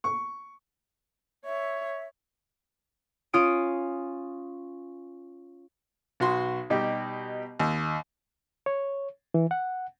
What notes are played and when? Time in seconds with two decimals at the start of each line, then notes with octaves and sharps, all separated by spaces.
0.04 C#6
1.45 C#5 E5
3.33 C#4 F4 D#6 D7
6.20 B1 F#4 C6
6.70 B2 G3 D#4 G4
7.60 D#2
8.66 C#5
9.34 E3
9.51 F#5